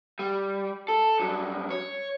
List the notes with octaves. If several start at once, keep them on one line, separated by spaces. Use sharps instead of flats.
G3
A4
G2 F#3
C#5